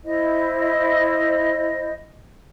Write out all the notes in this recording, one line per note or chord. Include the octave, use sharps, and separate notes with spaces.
E4 C5 D#5